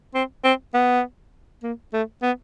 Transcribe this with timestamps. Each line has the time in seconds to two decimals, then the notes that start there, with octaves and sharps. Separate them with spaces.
0.14 C4
0.44 C4
0.74 B3
1.63 A#3
1.93 A3
2.22 B3